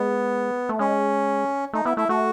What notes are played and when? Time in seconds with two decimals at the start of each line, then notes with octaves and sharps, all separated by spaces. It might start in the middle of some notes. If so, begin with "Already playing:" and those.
Already playing: G#3 B3
0.69 A3
0.79 G#3 C#4
1.73 A3 D#4
1.85 B3 E4
1.97 A3 E4
2.09 A3 F#4